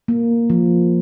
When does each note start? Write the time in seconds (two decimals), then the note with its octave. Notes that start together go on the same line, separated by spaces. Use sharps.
0.08 A#3
0.50 F3